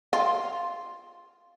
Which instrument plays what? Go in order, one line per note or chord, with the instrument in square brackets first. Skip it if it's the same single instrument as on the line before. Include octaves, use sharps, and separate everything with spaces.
[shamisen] F4